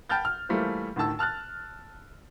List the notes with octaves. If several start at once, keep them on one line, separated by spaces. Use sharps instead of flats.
G5 A5 B5 F6 G6 A6
F6
E3 G3 A3 A#3 F4 C5
D2 A2 D#3 A5 E6
A5 F6 F#6 A6